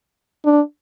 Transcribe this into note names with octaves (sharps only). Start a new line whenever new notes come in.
D4